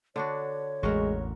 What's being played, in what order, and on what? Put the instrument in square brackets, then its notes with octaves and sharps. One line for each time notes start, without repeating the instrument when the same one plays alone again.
[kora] D3 D4 F#4 [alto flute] C#5
[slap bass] A1 E2 [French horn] G#3 [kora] F#4 A#4